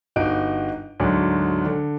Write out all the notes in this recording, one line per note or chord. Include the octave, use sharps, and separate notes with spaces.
G1 D#4 F#4 D7
D2 G#2 F#3 D4
D3